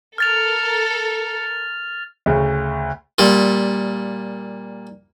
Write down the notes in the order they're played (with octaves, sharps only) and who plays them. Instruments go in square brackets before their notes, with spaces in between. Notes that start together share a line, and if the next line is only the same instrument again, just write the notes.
[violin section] A4 A#4 [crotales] F6 A6 F7
[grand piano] D2 C#3
[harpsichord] A#2 G3